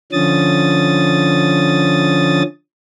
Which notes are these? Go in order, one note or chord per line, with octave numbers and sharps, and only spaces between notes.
D3 F3 C#4 D#6 A6